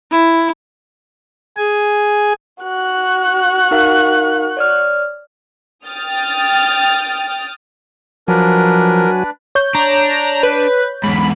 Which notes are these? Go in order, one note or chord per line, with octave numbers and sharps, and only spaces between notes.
E4
G#4 G#5
F#4 F#6
D#4 A#4 F5
C#5 D5 F6
G5 D#6 F6 A6
F3 F#3 D4 F#4 A#4 B4 D5 G#5
C#5 G6
D4 A#5
B4
E2 G#2 B5